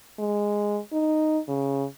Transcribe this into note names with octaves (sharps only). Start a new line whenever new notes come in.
G#3
D#4
C#3